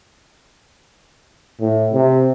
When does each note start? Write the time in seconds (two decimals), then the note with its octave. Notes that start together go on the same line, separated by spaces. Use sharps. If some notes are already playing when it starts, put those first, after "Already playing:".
1.60 A2
1.93 C3